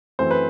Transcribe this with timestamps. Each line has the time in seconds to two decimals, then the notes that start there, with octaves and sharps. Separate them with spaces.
0.19 F#2 E3 A3 C4 C5
0.31 B4